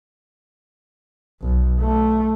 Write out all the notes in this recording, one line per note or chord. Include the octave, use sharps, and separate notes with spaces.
B1
A3